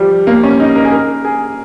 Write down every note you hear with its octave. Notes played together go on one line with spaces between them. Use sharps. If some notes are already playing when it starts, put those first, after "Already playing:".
Already playing: F3 G3
A#3
C#4
D#4
A#4
G#4
A#4
G#4